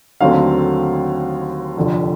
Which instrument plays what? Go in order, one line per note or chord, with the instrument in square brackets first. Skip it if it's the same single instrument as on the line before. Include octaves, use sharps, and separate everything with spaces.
[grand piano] D#2 D3 F#3 A3 C4 F5
F1 F2 D3 F3